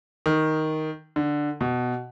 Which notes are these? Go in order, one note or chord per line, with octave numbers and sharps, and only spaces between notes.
D#3
D3
B2